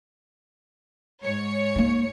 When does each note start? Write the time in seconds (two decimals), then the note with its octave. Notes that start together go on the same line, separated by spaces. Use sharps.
1.23 G#2 C#5 C#7
1.76 A#3 D#4